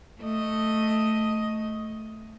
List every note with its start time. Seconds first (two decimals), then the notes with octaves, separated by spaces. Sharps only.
0.21 A3 D#5